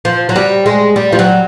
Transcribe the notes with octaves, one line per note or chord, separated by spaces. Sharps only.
F3
F#3
G3
G#3
G3
F3
F#3